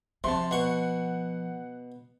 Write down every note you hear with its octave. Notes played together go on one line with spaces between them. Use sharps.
C3 F3 A5 C6
B2 F#5 C#6